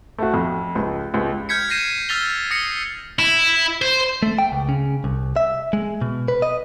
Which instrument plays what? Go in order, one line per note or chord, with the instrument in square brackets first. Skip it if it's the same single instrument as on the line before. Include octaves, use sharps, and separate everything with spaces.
[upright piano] A3 F#4
F2
C#2
C#2
[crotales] F6 G6 G#6 B6 C#7
G6 G#6 A#6 C7 D#7 E7
E6 F6 A6 B6 F7 G7
D#6 A#6 C7 C#7
[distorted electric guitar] E4
C5
[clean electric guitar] A3
G5
C#2
C#3
C2
E5
G#3
B2
B4
D#5